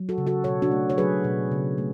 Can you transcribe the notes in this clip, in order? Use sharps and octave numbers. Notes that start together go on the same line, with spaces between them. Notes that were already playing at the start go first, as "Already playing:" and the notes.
Already playing: F#3
F#4 A4
C#3
F#4 A4
B2 A4 C#5
D4 F#4
A3
C#5
F#3 G#4 B4
B2
C#3
A3